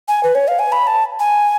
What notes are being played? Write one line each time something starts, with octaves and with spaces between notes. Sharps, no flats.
G#5
B4
C#5
F5
G#5
B5
A5
G#5